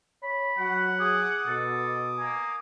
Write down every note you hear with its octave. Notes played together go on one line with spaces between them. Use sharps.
C#5 B5
F#3 F#4 F#5
G#4 D6 D#6
B2 A4
A#3 G#5